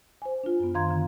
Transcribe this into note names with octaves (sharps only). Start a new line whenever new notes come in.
C5 G#5
D4 F4
F#2 B3
F#2 D#3 F5 A#5 C6 G#6
D3